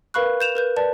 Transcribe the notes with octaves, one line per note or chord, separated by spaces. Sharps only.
A#4 B4 F5 B5 C#6 F#6
G6 E7 F7
A#4 B4 G6
B4 D5 A5